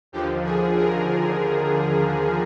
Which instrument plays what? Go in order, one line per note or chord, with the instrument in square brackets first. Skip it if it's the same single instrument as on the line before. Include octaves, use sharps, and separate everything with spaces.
[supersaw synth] D#2 D3 F3 G4
G#4
A#4